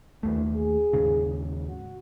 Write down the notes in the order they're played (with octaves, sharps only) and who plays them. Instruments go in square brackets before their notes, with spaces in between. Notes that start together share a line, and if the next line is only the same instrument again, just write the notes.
[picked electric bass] D#2 A3 [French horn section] D3 E3 B3
[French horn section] G#4
[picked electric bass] D#2 G#2 C#3
[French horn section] F#4